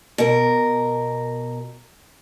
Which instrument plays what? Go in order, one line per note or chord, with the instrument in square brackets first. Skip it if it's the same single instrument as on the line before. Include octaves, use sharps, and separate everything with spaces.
[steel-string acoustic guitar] B2 A#4